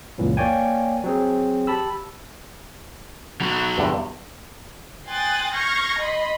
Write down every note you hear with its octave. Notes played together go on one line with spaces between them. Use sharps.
C#2 F#2 A#2 E3 F#3
A#3 C#5 D5 G5 G#5
F#3 C4 G#4
G4 A5 B5 E6
B2 F#3
E2 G2 D3
G5 G#5 C6 D#6 F#6 A6
C#6 F6 G6 G#6 A#6 C7
D#5 B5 C6